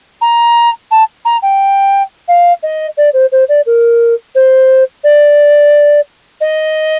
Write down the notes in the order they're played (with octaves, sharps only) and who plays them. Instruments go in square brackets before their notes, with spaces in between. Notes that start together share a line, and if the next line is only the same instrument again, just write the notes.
[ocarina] A#5
A5
A#5
G5
F5
D#5
D5
C5
C5
D5
A#4
C5
D5
D#5